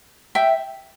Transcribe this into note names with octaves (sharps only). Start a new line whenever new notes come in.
E5 G5